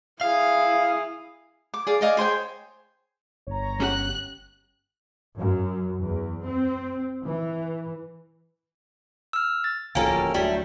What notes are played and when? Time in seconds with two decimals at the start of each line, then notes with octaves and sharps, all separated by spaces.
0.21 E4 G#4 F5
1.74 D6
1.87 G#4 D5 F5
2.01 D5 D#5 F5 G#5
2.17 G#4 C5 C#5 G5
3.47 G1 C#5 A#5
3.80 C#4 G4 F#5 F#6
5.39 F#2
6.03 E2
6.44 C4
7.22 E3
9.33 E6 F6
9.64 A6
9.95 D1 F3 A#3 C#4 A4 G5 A#5
10.34 D2 F#3 G3 A3 E4